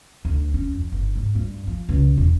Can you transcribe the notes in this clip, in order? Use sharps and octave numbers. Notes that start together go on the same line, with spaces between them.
D2
C#4
F2
G1
G#2
G2
F3
C#2
E1